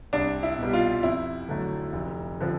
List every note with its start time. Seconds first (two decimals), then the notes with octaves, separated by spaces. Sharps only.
0.13 C2 D4
0.43 E4
0.58 B2 G3
0.73 F4
1.03 F2 E4
1.49 D3 F#3 A3
1.93 F1
2.40 D3 F3